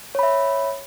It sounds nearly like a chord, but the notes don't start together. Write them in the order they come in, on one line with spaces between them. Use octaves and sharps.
C#5 B5 E5